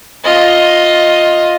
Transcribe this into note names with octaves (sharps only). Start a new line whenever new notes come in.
F4 D#5